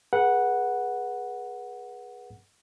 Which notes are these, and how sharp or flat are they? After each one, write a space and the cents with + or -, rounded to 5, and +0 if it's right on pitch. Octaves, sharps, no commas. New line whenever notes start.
G#4 +0 B4 -35 F#5 +0